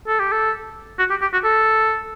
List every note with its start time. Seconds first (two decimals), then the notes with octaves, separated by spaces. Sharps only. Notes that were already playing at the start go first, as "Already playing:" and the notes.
0.07 A4
0.20 G4
0.32 A4
0.99 F#4
1.10 G4
1.21 G4
1.33 F#4
1.44 A4